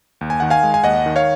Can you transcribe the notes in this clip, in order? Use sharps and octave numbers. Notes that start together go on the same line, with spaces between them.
D#2
G#5
D#3 F#5
F5 G#5
G#3
G#5
D#2 D#5 F#5
D#3
C#5 F5